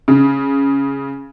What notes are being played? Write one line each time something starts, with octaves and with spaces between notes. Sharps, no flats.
C#3